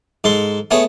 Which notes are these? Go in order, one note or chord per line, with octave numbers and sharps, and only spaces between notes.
G#2 A4 C6
A3 B3 G#4 C#5